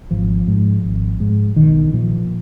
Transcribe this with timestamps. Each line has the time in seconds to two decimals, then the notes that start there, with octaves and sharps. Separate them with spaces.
0.11 G#1 F3
0.48 G#2
0.84 G#1
1.20 G#2
1.56 B1 D#3
1.93 A#2 F3